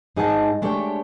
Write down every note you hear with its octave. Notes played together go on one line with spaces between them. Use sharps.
G#2 D#4 G#4 D#5 F#5 A5
G#3 A3 D4 G4 C#5 G5